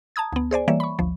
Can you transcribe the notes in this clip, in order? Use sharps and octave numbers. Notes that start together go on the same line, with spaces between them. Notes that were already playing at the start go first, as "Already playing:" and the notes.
A5 A#5 D#6 G#6
D2 B3
G#4 C5 D5 G#5
E3 G3 A#3 C#5 D5 E5
B5 C#6
G#1 D2 F3